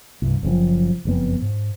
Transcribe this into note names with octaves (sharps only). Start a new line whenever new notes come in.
C2 G2
F#1 F#2 C3 F3
F#1 F2 B3
G#2